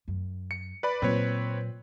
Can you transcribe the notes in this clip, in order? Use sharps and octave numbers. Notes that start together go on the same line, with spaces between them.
F#2
C#7
B4 D5 B5
A#2 F#3 C4 B4 C#5